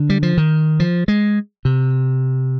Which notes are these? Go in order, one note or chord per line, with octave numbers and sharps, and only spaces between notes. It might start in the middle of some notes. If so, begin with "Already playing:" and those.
Already playing: D3
G3
F3
D#3
F3
G#3
C3